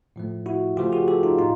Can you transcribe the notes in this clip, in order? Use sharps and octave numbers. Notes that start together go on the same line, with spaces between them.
A2 F3 A3
E4 F#4
C#3 F3 A3 F4 G4
F#4 G#4
G4 A4
D#4 F4
A2 D#4 F4